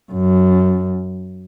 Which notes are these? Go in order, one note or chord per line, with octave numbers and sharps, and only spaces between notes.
F#2